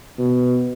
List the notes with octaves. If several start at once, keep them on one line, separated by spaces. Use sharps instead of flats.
B2